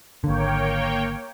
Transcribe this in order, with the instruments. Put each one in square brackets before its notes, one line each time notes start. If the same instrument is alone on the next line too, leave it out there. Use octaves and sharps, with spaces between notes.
[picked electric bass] G#1 D3 [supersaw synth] A#3 C#5 G5